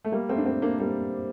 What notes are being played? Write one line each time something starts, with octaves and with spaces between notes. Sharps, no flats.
A3
G3 A#3
A3 C4
D4
A3 C4
A#3 D4
G3 A#3